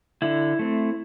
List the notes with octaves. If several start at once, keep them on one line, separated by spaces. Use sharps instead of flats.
D3 E4
A3 C4